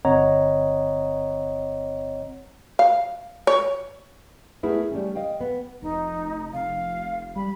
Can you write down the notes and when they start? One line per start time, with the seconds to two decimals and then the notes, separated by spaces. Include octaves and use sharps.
0.05 G1 C4 C#5 D#5 F#5 A#5
2.79 F5
3.47 C#5
4.63 A3 B3 E4 G#4 A#4 F#5
4.91 G3 A3 C#4
5.15 D#5 F5 G5
5.41 B3
5.82 F1 D#4
6.53 F1 F5
7.36 G3 B5